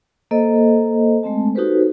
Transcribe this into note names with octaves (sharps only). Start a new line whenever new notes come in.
A#3 A4 C5 D#5
G#3 A3 C4 A5
D#4 F#4 G4 A4 B4 C5